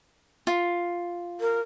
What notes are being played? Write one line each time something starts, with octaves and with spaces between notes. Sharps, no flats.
F4
A#4